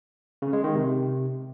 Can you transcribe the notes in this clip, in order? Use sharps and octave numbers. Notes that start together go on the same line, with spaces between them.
C#3
G#3
D#3
C3